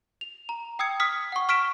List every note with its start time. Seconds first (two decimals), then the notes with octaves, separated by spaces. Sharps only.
0.21 F7
0.49 A#5
0.79 G5 D#6 E6 G#6 C#7
1.00 D#6 F6 B6
1.32 F#5 C#6
1.49 C#6 F6 B6 D7 E7